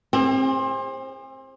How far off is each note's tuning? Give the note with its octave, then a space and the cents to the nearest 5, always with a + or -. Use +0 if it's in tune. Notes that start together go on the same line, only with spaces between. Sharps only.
C4 +25 G#4 -45